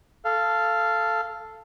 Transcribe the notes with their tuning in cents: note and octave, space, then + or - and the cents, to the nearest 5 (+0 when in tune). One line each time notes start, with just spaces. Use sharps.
A4 +0 F5 -15